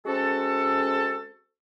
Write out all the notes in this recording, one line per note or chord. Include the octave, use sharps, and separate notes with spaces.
G#3 C4 C#4 F#4 A4